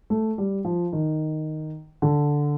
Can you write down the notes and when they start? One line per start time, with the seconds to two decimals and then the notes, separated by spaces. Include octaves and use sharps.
0.10 A3
0.38 G3
0.65 F3
0.93 D#3
2.02 D3